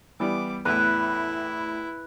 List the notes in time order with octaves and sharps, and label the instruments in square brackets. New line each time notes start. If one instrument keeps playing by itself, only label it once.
[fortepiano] E3 G3 B3 [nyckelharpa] D6
[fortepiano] E2 A2 [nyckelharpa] E4 [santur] B4